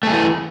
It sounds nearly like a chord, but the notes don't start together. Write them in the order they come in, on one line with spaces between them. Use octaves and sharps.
A3 G#4 E3